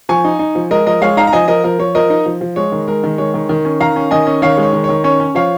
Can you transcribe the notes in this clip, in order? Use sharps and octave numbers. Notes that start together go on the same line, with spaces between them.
F3 G#5 C#6
D#4
D#4
F3
G#3 A#4 D#5
F3 A#4 D#5
G#3 C#5 F5
D#4 F5 A#5
A#5
F3 D#5 G#5
F3 A#4 D#5
F3 A#4
F3 C#5
F3 A#4 D#5
D#4
F3
F3
G#3 C#5
D#3
G#3 A#4
D#3
G#3 C#5
D#3
D#3
C#4
D#3 F5 A#5
C#4
D#3 D#5 G#5
C#4
D#3 C#5 F5
G#3
C#5
D#3
D#3 C#5
C#4 C#5
C#4
F3 C#5 F5